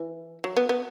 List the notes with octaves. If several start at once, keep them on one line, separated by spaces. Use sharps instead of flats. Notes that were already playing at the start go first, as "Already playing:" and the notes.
Already playing: E3
F#3
B3
B3